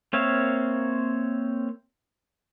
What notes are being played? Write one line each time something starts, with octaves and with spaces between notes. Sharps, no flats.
A#3 C4 C#5 E5 F5